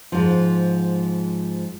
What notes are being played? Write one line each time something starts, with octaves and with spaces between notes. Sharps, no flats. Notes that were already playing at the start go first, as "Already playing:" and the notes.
G#2 F3